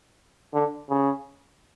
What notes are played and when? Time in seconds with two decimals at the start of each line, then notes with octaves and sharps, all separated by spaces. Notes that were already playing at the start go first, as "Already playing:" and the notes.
0.54 D3
0.90 C#3